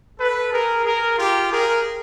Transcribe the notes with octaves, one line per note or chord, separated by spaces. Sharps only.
A4 B4
G#4 A#4
G#4 A#4
F4 G4
G#4 A#4